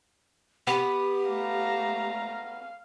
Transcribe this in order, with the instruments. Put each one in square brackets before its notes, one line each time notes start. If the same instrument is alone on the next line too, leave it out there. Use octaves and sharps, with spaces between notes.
[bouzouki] B3 [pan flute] G4
[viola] A3 A#5 [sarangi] F5